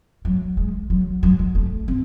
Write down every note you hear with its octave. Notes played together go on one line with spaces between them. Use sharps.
F#3
G#3
F#3
F#3
G#3
A3
C4